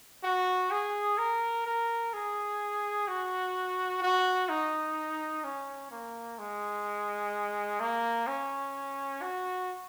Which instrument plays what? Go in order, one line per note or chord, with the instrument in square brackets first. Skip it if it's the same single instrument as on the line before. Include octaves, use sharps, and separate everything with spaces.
[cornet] F#4
G#4
A#4
A#4
G#4
F#4
F#4
D#4
C#4
A#3
G#3
A#3
C#4
F#4